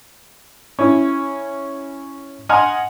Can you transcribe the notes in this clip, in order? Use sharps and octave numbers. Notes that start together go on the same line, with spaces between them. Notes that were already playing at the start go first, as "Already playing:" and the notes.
C#4 E4
D#5 F#5 G#5 A#5 C6 F6